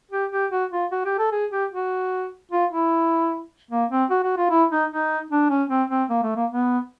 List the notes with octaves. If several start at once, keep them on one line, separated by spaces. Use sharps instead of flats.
G4
G4
F#4
F4
F#4
G4
A4
G#4
G4
F#4
F4
E4
A#3
C4
F#4
F#4
F4
E4
D#4
D#4
D4
C#4
C4
C4
A#3
A3
A#3
B3